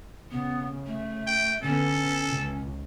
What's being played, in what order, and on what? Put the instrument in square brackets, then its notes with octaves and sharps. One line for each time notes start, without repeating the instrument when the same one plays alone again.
[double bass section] C#3 [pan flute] B3
[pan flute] A3
[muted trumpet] G5
[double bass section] D3 B3 [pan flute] C#4 [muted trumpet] A4
[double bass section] C#2